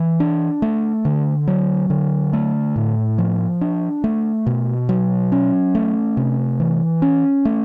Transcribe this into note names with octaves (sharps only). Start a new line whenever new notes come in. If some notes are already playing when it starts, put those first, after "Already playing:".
Already playing: E3
D4
A3
D3
F#3
D3
A3
A2
F3
D4
A3
B2
F#3
C#4
A3
C3
E3
C#4
A3